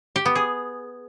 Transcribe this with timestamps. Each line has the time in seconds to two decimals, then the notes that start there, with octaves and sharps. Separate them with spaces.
0.16 G4
0.26 B3
0.35 G#4